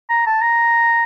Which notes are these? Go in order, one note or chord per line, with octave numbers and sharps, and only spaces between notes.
A#5
A5
A#5